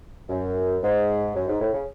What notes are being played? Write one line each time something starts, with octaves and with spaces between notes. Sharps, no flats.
F#2
G#2
F#2
G#2
A2
C#3